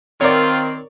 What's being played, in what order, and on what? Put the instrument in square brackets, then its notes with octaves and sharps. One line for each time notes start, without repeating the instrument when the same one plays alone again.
[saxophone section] D#3 C4 [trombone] F4 [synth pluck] A#4 C#6 [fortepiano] C#5 D5